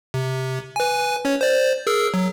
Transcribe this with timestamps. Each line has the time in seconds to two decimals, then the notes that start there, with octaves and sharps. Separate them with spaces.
0.14 C3
0.76 B4 G#5
1.25 C#4 C#5
1.41 C5 D5
1.87 G#4 A#4 E6
2.14 F#3